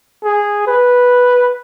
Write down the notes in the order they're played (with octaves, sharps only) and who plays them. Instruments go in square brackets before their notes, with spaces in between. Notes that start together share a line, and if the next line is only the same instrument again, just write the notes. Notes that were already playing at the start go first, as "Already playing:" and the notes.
[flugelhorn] G#4
B4